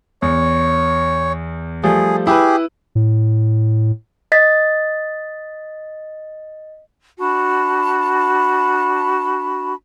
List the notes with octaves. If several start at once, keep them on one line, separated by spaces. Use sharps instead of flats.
E2 C#5
F3 G3 A3 G#4
E4 G4 G#4 B4
A2
D#5 A6 B6
D4 F#4 A5 B5